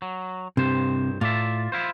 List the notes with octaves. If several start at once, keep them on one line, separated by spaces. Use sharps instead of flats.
F#3
C2 G2 C3 C5
A2 F4 D5 E5
E4 F4 C5